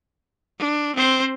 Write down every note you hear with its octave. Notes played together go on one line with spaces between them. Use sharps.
D4
C4 C5